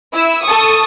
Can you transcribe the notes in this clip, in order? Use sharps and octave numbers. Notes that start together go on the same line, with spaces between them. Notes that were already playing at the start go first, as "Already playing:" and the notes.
E4 E6
A4 C#6 D#6